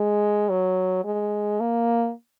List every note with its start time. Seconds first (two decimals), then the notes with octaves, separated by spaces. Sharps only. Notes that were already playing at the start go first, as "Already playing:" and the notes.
Already playing: G#3
0.49 F#3
1.04 G#3
1.60 A#3